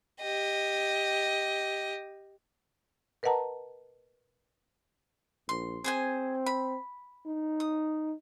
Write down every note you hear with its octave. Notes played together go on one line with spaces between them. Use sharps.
G4 D#5
A#4 B4 D#5 F#5 A5 A#5
A#1 C6
C4 G#4 C5 G#5
B5
D#4
D#6